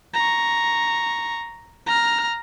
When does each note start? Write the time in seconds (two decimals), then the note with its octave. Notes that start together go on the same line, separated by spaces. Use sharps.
0.14 A#5 C#6
1.86 A#5 F6